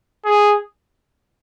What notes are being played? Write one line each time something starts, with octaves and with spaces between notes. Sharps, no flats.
G#4